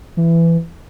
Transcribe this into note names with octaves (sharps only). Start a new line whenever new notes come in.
E3